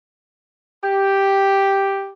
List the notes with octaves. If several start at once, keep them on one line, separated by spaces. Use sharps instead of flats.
G4